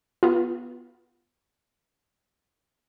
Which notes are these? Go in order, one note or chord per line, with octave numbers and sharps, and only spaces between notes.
B3 F4